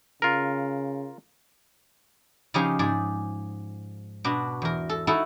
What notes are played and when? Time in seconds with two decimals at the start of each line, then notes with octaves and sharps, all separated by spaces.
0.22 C#3 F4 A#4
2.54 C#3 F3 D#4 G4 G#4 C5
2.79 G#2 G#4 D5
4.24 B2 D4 F#4
4.62 E2 A#4
4.89 A4
5.07 D#4 E4 F#4 A4